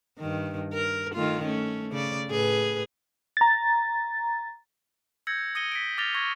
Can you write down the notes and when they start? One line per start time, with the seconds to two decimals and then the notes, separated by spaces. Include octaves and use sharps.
0.18 G2 D#3
0.73 A#4
1.15 D#3 A3 F4
1.44 A3 C#4
1.92 C#3 D5
2.28 A2 G#4 B4
3.37 A#5 A6
5.27 E6 G6 G#6 A#6 C#7
5.55 D#6 A#6 C#7 D#7 G7
5.72 B6 D7
5.98 D6 F6 A6 A#6 F7 G7
6.14 C#6 G#6 A#6